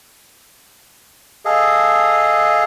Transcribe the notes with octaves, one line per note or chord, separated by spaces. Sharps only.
G#4 A4 D#5 F5